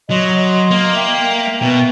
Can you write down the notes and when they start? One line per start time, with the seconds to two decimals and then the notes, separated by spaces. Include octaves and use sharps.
0.10 F#3 D#5 C6
0.71 A#3
0.95 A#4 E5 G5
1.62 B2